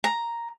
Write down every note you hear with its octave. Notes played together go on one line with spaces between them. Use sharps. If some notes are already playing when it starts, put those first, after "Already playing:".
A#5